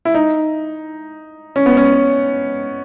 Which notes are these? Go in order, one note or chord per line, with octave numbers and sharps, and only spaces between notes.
E4
D#4
C#4
B3
C#4